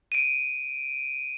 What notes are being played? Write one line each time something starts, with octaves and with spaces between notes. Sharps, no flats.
D7 D#7